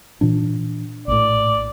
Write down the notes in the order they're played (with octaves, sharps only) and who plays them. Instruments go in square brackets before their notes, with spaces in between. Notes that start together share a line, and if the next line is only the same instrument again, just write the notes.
[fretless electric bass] A#2 E3 D4
[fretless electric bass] A#1 A2 [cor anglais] D5